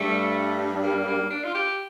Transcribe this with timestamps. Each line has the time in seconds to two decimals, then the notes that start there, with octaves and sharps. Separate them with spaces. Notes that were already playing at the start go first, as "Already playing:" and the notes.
Already playing: G2 G3 A3
0.83 A#3
1.07 A#3
1.30 D4
1.44 F4
1.54 G4